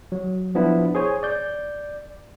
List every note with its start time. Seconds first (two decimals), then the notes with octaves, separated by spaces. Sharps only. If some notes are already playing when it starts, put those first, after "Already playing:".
0.12 F#3
0.55 F3 B3 D4 E4 F4
0.95 G#4 C5 C#5 G#5
1.23 D5 G6